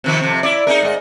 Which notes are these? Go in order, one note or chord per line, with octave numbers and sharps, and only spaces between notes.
C3 D#3 F3
F2 C3
E4 D5
D#4 G#4 A#4
G#2 D#5